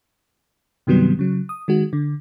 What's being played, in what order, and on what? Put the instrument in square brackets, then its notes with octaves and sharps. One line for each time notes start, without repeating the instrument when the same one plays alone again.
[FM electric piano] G2 C3 D#3 F#3 G3 B3
C#3 F#3
D#6
D#3 G#3 F#4
D3